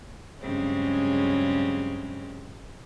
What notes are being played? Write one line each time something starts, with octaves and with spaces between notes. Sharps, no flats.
G2 C#3 F#3 G#3 C4 C#4